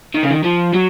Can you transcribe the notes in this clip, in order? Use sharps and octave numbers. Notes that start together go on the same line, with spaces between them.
D#3
C#3
D#3
F3
F#3